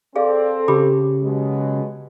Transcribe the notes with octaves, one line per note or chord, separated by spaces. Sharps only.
C4 G#4 A4 D5 F5
C#3 G4 B5 D6
B2 F#3 G#3